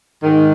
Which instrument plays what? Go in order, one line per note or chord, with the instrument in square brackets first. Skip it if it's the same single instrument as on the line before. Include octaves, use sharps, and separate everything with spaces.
[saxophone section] G#2 D#3